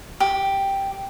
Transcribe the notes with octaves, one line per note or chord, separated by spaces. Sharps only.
G4